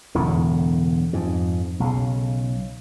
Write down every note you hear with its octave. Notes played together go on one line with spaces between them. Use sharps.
E1 E2 A2 D3
F2 G#2
B1 C#3